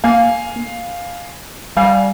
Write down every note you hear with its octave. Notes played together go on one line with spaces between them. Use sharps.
A#3 F5 G#5
G3 F5 G#5